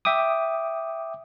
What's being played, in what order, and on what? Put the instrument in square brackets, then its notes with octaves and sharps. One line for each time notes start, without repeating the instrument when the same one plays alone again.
[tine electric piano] E5 G5 D6 D#6